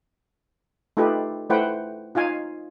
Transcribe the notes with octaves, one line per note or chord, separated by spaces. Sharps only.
A3 D#4 F4 G4 A4 B4
A3 E4 B4 C5 F#5 G5
D#4 F4 F5 G#5